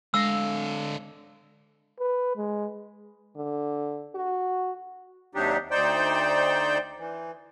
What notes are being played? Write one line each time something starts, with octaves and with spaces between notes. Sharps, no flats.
D3 G#3 F5 E6 A#6
B4
G#3
D3
F#4
D#2 C3 F#3 D4 D#4 G4
D2 D#4 C5 D5 G5 G6
E3